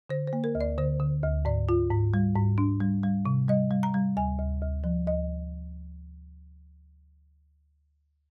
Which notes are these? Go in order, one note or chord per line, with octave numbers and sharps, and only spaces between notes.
D3 C5
C5
A#3
A#4
D2
D5
D3 C5
D3
D2
G#2 D5
F4
G#2
G3
G#2
D4
G3
G3
C3
G3 D#5
G3
A#5
G3
D2 G#5
D2
D2
F3
D2 D#5